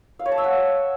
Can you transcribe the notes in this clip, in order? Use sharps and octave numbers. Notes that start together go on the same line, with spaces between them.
F5
C#5
A5
E5
F#5